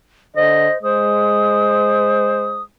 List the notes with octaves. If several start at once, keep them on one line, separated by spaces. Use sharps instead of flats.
D3 C5 D#5
G#3 C5 D#6